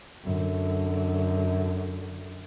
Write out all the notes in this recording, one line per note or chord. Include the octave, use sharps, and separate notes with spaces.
F#2 D3